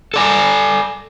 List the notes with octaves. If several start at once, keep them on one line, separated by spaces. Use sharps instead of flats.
A4 D5 G#5